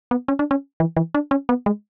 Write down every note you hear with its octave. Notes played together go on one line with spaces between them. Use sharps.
B3
C#4
D4
C#4
E3
E3
D4
C#4
B3
G#3